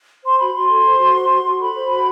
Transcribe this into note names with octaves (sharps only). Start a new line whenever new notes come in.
C5 C6
F#4 B5
F#4 C6
A4
C5
F#4
C5
F#4
F#4
A4 B5
C5
F#4